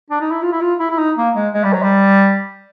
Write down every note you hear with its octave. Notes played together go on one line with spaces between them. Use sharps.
D4
D#4
E4
F4
E4
F4
E4
E4
D#4
A#3
G#3
G#3
G3
F#3
G3